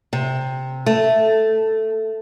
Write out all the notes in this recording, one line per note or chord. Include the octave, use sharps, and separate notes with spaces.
C3
A3